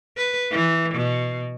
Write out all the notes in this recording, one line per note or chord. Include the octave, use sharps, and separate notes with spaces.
B4
E3
B2